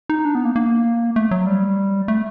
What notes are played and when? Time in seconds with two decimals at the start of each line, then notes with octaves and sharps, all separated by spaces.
0.09 D#4
0.25 D4
0.35 B3
0.45 A#3
0.56 A#3
1.16 A3
1.31 F#3
1.47 G3
2.08 A3